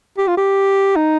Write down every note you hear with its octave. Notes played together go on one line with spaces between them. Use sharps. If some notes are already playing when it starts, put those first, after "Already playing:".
G4
F4
G4
D#4